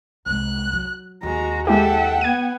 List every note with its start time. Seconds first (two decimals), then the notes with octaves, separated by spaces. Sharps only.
0.26 C2 G#3 F#6
0.73 F#3
1.23 D#2 G#3 F#4 A#5
1.67 G#3 E4 G4 A4 E5 F#5 G5
2.21 B3 G#6 D#7